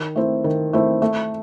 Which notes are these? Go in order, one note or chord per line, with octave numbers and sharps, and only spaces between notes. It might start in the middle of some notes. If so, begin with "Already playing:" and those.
Already playing: D#3
A3 C4 E4
D#3
A3 C4 E4
A3